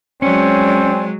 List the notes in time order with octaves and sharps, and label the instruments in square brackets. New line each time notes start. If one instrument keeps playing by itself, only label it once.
[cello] F#3 G#3 [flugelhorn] C4 [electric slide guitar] C#4 [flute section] C#5 D5 G#5